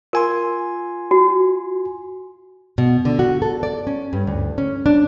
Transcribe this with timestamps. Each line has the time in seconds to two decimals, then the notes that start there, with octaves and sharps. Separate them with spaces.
0.13 F4 A#4 G#5 C6
1.11 F#4
2.78 B2
3.05 D3
3.19 F#4
3.42 A4
3.63 D5
3.87 C#4
4.13 G2
4.27 D2
4.58 C#4
4.86 D4